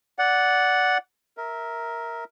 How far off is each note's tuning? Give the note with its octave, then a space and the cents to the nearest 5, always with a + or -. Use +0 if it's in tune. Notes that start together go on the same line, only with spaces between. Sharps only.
D5 -10 F#5 +0
A#4 +0 E5 -20